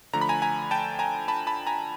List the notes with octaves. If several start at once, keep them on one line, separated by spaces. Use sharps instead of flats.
D3 F3 A3 A#5
B5
G#5 A#5
G#5 A#5
G5 A5
G#5 A#5
A5 B5
A5 B5
G#5 A#5